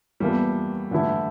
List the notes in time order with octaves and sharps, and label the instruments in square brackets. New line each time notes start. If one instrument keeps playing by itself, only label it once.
[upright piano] E2 E3 A#3 F4 A4 [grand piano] G3
[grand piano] D3 [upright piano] E3 A3 E4 A4